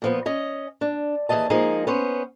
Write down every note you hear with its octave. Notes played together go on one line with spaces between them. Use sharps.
A#2 F3 B3
C#4 D#5
D4
D#2 E3 F#3 G#4 D#5 A5
F3 G#3 A#3 D#4 G#4
B3 C#4 C5